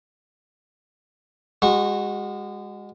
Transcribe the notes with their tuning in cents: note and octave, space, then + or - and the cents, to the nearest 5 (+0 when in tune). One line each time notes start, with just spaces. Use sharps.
G#3 -30 F#4 +0 C#6 -25